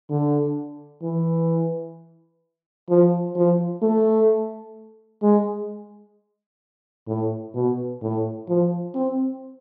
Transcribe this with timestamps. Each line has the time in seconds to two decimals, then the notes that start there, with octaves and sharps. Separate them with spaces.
0.10 D3
1.03 E3
2.89 F3
3.36 F3
3.82 A3
5.23 G#3
7.08 A2
7.55 B2
8.02 A2
8.48 F3
8.95 C4